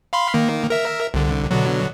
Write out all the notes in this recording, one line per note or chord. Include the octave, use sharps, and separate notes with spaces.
F5 B5 C6
D#3 A#3
A#4 E5
C2 D3
B2 D3 F#3